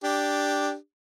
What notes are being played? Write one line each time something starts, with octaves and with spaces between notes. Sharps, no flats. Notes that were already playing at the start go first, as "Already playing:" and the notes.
D4 G4